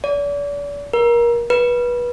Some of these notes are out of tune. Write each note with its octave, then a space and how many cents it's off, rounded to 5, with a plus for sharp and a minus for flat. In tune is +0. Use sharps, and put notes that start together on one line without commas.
D5 -40
A#4 +25
B4 -25